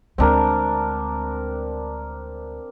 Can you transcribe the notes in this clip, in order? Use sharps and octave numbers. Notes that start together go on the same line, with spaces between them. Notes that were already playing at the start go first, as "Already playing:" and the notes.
D2 G#3 C4 D4 A#4